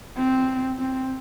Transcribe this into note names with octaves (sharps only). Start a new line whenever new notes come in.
C4
C4